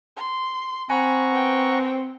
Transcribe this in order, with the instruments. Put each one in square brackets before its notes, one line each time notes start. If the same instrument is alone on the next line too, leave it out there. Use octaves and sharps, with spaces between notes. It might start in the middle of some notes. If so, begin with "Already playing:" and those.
[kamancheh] C6
[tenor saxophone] C4 [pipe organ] F#5 A#5 C#6 [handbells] G#5 [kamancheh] B5
[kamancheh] B3 G5